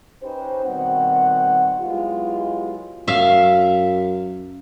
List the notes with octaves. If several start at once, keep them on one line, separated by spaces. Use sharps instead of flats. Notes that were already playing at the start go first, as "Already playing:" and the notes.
C#4 D#4 G4 B4 C5
B2 D#3 G3 C4 F#5
F#3 G#3 B3 E4 F4 G4
F#2 E5 F5